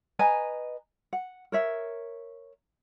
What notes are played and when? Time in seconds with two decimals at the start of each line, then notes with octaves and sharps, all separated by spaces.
0.19 B4 D#5 G#5 A#5
1.13 F#5
1.52 A#4 C#5 E5